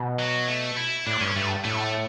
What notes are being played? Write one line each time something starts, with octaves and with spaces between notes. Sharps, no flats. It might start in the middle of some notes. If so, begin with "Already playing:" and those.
Already playing: B2
F#3
A3
E4
A2 D4
G2 C#4
G2 A3
A2 A3